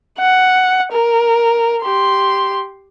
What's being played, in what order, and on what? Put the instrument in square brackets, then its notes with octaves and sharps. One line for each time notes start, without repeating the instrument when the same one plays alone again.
[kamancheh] F#5
A#4
G4 C6